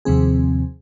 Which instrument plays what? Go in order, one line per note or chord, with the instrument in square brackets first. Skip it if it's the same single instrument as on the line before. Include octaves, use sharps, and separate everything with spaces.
[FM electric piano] D#2 C3 F3 C4 G#4